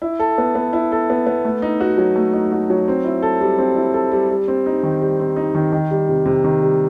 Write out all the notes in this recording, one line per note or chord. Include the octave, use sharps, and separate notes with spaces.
E4
A4
B3
B3
E4
A4
B3
B3
A3
D#4
F#4
F#3
A3
D#4
F#4
F#3
C4
E4
A4
G3
C4
E4
A4
G3
G3
C4
D#4
D#3
G3
C4
D#4
D#3
D#3
G3
C3
C3
D#3
G3